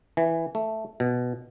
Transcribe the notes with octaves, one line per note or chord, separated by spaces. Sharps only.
E3
A3
B2